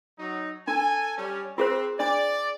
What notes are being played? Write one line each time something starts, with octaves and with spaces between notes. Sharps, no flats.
F#3 D#4
D4 A4 G#5
G3 C#4
C4 F4 G#4 C5
D4 D5